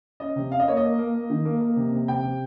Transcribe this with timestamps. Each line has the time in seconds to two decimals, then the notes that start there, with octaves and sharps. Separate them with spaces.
0.20 C#4 D#5
0.36 C3
0.52 C#4 F5
0.60 D#5
0.68 A#3 C#5
0.77 D#5
0.83 A#3
0.98 A#3
1.14 A#3
1.30 D#3
1.45 A#3
1.61 A#3
1.76 C3
1.92 C3
2.08 C3 G5
2.23 C3